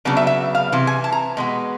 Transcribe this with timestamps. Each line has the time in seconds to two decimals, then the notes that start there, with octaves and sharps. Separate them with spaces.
0.05 C#3 F#3 B3 D4
0.17 E5
0.27 E5
0.55 F5
0.72 C3 E3
0.87 G#5
1.04 A5
1.12 A#5
1.37 B2 G#3 B3